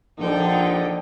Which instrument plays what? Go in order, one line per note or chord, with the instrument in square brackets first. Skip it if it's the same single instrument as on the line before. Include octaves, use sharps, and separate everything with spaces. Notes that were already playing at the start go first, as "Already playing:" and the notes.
[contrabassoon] A#1 [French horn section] D3 [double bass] F3 [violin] D#4 G5